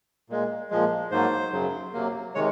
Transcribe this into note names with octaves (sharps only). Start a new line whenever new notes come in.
A#2 G#3
A#2 F3 G#3
G#2 F#3 A#3 C5
F#2 C#3 F#3
C3 F#3 A#3
C3 D#3 G#3 C#5